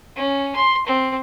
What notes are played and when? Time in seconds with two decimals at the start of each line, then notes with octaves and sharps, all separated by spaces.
0.16 C#4
0.56 C6
0.86 C4